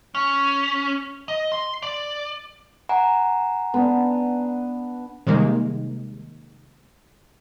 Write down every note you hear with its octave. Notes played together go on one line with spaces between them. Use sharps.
C#4
D#5
C6
D5
F#5 G#5 A#5
B3 D4
C3 D#3 G3 G#3 A#3